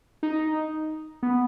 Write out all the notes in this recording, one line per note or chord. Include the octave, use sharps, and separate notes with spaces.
D#4
B3